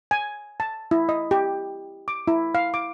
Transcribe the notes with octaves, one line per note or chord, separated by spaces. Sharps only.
G#5
A5
E4
D#5
G4
D6
E4
F5
D6